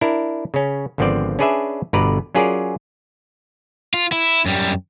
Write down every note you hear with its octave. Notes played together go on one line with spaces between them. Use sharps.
D4 E4 A#4
C#3 C#4
G#1 D3 F3 B3 C4 D5
C#4 D4 G#4 B4 D5 E5
G1 B2 D3 B4 D5 A#5
F#3 C#4 F4 G#4 A#4 D5
F4
E4
F#2 G3